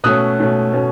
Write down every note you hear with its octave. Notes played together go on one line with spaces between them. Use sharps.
B2 A3 C#4 D#6 F#6
B2 A3 C#4
B2 A3 C#4